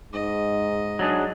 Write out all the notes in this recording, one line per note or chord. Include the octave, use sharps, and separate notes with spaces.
G#2 D#5
F#3 D4 G#4